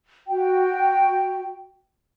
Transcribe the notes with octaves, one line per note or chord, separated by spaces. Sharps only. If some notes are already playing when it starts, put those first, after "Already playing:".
F#4 G5